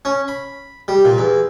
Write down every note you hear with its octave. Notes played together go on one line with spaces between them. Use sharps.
C#4
B5
G3
A#2
E2